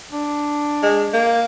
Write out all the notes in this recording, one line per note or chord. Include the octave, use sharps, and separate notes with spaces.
D4
G#3
A#3